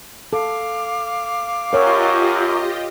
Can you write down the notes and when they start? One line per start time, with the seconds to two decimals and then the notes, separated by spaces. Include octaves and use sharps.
0.33 A4 F5 D6
1.73 F#2 F4 G4 A#4 C#5 D#5